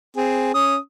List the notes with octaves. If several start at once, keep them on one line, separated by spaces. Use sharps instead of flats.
C4 G#4
C#4 D#6